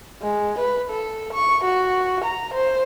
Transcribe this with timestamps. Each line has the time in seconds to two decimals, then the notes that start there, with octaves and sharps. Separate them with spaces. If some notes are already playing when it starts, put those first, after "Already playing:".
0.22 G#3
0.59 B4
0.90 A4
1.33 C#6
1.64 F#4
2.25 A#5
2.54 C5